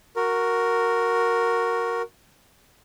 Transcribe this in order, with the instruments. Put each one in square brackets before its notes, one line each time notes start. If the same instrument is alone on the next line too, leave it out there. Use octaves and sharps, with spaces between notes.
[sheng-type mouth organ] F#4 A#4